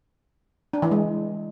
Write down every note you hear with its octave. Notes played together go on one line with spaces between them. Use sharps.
D4
E3
G#3